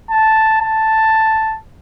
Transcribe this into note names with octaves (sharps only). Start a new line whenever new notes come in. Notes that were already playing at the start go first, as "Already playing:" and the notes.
A5
A5